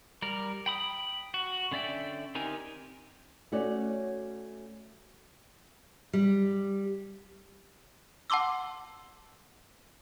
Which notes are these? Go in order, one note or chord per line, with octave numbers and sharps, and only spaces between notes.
G3 A#4
G5 B5 D#6
F#4
D3 C#4 D5 E5 G5
C4 D#4 G4 A#4 G#5
A3 C#4 F#4 C#5 D5
G3
F#5 A5 C6 D6 E6